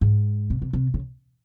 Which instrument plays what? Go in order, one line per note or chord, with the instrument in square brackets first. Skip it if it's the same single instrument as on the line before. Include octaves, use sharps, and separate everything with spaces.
[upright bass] G#2
C3
C3
C3
C#3